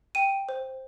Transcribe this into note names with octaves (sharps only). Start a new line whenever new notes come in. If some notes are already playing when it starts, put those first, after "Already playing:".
G5 D#7
C5